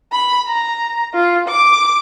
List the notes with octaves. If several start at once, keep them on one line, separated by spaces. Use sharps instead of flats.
B5
A#5
F4
D6